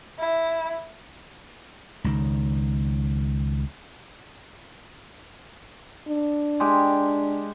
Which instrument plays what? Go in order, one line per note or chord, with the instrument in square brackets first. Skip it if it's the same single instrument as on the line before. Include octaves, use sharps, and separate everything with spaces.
[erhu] E4
[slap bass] C#2 D#3
[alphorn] D4
[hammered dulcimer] G#3 G4